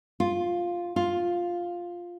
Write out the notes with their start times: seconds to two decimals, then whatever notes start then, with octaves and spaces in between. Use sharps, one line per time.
0.20 F4
0.96 F4